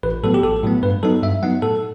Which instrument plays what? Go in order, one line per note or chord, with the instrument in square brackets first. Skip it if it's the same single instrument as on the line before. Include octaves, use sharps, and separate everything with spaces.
[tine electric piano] A1 B4
A2 F#3 B3 A4
G4
A1 A4
A2 F#3 B3
G2 B4
F#3 B3 D#4 A4
G2 E5
F#3 B3 D#4 F#5
A2 A4